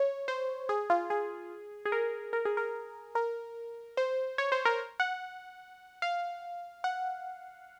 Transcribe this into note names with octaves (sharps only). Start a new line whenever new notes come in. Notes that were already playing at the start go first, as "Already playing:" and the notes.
Already playing: C#5
C5
G#4
F4
G#4
G#4
A#4
A#4
G#4
A#4
A#4
C5
C#5
C5
A#4
F#5
F5
F#5